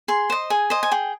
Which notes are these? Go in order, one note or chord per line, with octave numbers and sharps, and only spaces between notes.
G#4 C6
C5 D#5
G#4 G#5
C5 D#5
G#5
G#4 G5